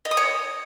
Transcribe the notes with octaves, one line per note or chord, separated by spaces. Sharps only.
D#5
D#6
C#5